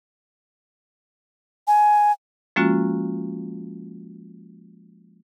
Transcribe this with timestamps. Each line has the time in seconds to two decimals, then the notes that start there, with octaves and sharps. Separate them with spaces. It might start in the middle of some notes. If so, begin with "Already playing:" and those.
1.68 G#5
2.56 F3 G#3 A#3 C#4 F4 F#4